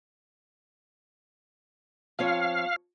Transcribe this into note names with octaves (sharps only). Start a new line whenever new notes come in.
F3 C4 C#5 F5